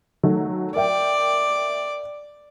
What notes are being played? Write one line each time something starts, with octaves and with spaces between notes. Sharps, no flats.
D#3 F#3 A3
A#4 D5 E5 G5